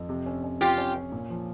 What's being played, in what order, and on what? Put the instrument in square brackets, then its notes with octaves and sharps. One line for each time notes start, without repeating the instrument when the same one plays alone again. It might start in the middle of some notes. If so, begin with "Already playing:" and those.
Already playing: [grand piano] F2
C3
C#4
C#4
[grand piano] C#4 [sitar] F4 G4
[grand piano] C#4
C#4
A#2
F3